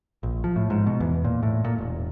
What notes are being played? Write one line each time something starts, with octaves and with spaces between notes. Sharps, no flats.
A#1
F3
A2
G#2
B2
E2
A#2
A2
A#2
E1